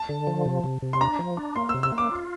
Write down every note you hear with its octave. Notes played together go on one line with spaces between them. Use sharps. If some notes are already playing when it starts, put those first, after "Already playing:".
Already playing: A5
D3
F3
C3
C3
C3
C6
D4 A#5
F3
D4
A#3 C6
C3 E6
E6
A#3
D6
F4